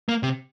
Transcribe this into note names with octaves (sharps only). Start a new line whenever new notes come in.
A#3
C3